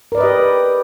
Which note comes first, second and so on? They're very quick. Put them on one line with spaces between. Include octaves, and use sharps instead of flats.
A#4 D5 B4 D#5 G4